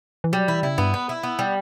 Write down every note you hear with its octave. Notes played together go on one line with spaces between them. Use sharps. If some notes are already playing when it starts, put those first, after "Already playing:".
E3
F#3 G3
E3 E4
C#3 E4
G2 B3
B4
E4
B3
G3